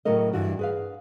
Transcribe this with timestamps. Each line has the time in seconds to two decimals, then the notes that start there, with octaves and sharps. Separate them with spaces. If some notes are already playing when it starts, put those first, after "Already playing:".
0.05 A2 C#3 F#3 A3 A#4 D#5
0.33 G2 E3 F#4 G4
0.59 G#4 B4 F5